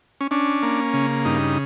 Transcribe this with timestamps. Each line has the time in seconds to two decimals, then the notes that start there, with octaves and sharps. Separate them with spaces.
0.21 C#4
0.31 C#4 D4
0.63 A#3
0.94 C#3
1.25 G2 D#4